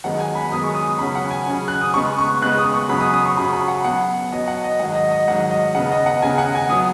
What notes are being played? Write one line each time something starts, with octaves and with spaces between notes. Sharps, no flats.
F#2 D#3 G#3 B3 F#5
G#5
B5
F#2 D#3 G#3 B3 D#6
C#6
D#6
D#6
C#3 F#3 C#4 B5
F#5
G#5
C#3 F#3 C#4
F#6
D#6
C#3 G#3 B3 C#6
C#6
C#3 G#3 B3 F#6
D#6
C#6
F#2 C#3 F#3 B5
D#6
D#6
C#6
F#2 C#3 F#3 B5
B5
F#5
B2 F#3 B3 F#5
B2 F#3 B3 D#5
F#5
D#5
G#2 D#3 F#3 F#5
D#5
D#5
G#2 D#3 F#3 F#5
D#5
C#3 B3 F#5
D#5
F#5
C#3 B3 G#5
F#5
G#5
F#3 B3 D#6